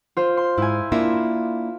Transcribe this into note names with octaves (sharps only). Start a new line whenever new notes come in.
F4 C5
C6
G#2 E4 G#5
A#3 D4 E4 F4